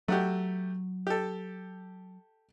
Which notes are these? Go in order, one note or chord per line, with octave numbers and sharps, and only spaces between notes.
F#3 A3 F#4 G4
G4 A4